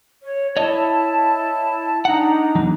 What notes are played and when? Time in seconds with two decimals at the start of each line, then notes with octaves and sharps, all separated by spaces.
0.22 C#5
0.57 E4 C#5 D#5 A5
2.05 D4 D#4 F#5 A#5
2.55 E2 F#3 D#4